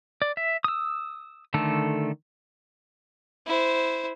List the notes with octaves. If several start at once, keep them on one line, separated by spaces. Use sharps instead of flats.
D5
E5
D#6 E6
D3 D#3 A3 A4
E4 C5